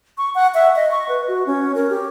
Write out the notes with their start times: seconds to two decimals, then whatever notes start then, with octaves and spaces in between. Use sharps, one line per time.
0.18 C#6
0.35 F#5
0.54 E5
0.76 D#5
0.91 C#6
1.09 B4
1.28 F#4
1.47 C#4
1.75 A#4
1.90 G4